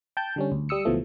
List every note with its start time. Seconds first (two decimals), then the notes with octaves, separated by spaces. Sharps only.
0.17 G5 A5 G6
0.36 D3 G3 C#4
0.52 D2
0.69 G3 D#6 E6 C#7
0.85 C#2 B2 E3 F3 A3